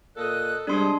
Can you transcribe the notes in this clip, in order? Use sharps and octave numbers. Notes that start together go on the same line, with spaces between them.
A#2 A4 D#5 F#6
C3 G3 G#3 D4 C6 D#6